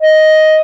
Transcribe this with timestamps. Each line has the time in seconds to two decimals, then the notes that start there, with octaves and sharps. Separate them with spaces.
0.01 D#5